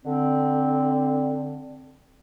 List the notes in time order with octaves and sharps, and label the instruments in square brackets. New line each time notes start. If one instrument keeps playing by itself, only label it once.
[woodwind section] D3 C4